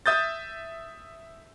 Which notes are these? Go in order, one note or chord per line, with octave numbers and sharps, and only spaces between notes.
E5 D#6 G6 A6